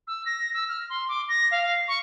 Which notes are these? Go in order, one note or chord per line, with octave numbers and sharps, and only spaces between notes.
E6
A#6
E6
F6
C6
D6
A#6
F5
C#6